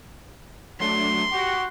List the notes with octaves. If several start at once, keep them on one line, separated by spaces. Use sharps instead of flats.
F#3 A3 D4 C6
F#4 G4